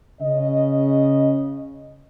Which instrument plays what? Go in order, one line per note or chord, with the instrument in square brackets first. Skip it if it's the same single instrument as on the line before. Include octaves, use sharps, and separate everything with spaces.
[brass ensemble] C#3 D#5